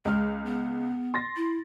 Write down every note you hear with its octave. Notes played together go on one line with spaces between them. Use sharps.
C#2 G#3 F6
B3
C6 A6 A#6
E4